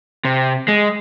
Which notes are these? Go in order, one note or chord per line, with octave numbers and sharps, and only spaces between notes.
C3
G#3